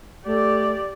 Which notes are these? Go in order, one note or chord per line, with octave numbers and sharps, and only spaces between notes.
A3 G4 D5